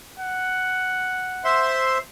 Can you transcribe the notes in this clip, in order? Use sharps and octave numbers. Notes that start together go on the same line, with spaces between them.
F#5
C5 E5 C6